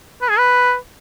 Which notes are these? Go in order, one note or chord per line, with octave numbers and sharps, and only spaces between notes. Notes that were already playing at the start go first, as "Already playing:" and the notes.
B4
G#4
B4